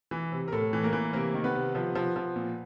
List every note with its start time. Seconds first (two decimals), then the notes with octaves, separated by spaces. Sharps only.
0.11 E3
0.32 C3
0.48 A#4
0.52 A2 A4
0.73 E3
0.83 A#3 A#4
0.93 E3
1.13 C3 A#3 A#4
1.34 D#3
1.44 B3 B4
1.55 C3
1.75 F3
1.95 F3
2.16 F3
2.36 A#2